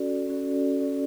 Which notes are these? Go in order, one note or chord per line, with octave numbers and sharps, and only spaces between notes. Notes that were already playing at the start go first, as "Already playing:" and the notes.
Already playing: C#4 F#4 A4 D5
C#4 F#4 A4 D5
C#4 F#4 A4 D5